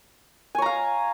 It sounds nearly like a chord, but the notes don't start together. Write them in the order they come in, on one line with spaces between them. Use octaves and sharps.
G#5 C#5 A#5 F5